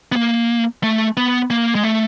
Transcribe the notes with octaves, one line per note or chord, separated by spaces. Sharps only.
B3
A#3
A3
B3
A#3
G#3
A3